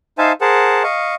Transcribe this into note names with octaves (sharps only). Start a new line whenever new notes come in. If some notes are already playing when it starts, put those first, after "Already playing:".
D#4 C5 E5 F5 G#5 A5
G#4 A#4 C5 F#5 A5
D#5 F5 C#6